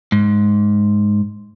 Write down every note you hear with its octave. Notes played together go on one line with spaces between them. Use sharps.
G#2